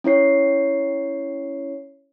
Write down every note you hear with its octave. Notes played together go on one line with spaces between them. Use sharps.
C#4 E4 C#5 C7